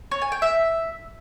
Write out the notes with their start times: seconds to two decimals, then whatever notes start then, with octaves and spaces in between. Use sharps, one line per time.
0.11 C#5
0.22 G#5
0.32 G5
0.42 E5